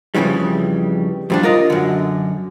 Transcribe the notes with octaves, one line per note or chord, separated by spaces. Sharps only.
F2 A2 C#3 E3 G3
F2 G3 D4
F4 A#4 D#5
F#2 D3